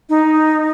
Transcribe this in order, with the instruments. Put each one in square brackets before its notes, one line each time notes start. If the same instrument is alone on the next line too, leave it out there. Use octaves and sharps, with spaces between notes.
[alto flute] D#4